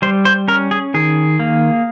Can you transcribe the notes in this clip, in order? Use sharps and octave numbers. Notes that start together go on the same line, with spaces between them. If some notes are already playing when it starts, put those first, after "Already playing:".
G3 C5
C5
C#4 A#4
G#4
D#3 G#4
A#3